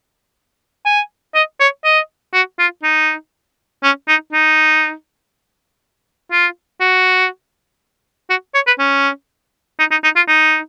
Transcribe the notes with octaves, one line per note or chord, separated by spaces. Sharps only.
G#5
D#5
C#5
D#5
F#4
F4
D#4
C#4
D#4
D#4
F4
F#4
F#4
C#5
B4
C#4
D#4
D#4
D#4
F4
D#4